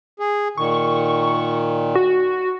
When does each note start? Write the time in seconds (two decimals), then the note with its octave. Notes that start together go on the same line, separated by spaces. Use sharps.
0.19 G#4
0.57 A#2 D#3 C#6
1.95 F#4